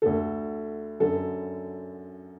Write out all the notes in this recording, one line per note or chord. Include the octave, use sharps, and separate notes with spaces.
D2 D3 A4
F#2 D3 A4